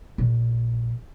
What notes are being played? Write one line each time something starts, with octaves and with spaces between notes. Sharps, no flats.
A#1